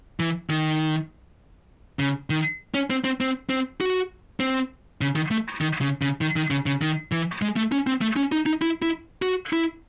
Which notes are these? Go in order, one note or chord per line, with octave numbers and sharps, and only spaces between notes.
E3
D#3
C#3
D#3
C#4
C4
C4
C4
C4
F#4
C4
C#3
D#3
A3
D#3
C#3
C#3
D#3
D#3
C#3
C#3
D#3
E3
G#3
A3
C#4
C4
A3
C#4
D#4
D#4
E4
E4
F#4
E4